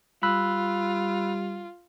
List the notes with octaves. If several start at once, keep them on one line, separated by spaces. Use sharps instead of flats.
G3 F4 B5 E6 F#6